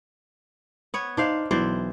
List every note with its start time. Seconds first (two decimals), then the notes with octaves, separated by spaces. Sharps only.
0.94 B3 C#5
1.17 D4 D#4 C5 F5
1.51 B1 E3 C5 D5